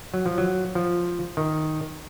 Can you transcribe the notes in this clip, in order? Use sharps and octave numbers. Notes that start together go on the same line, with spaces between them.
F#3
F3
F#3
F3
D#3